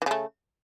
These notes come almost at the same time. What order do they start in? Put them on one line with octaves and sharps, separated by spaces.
E3 C#3 A3